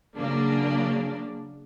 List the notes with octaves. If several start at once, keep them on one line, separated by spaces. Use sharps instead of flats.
C#3 F#3 A#3 D4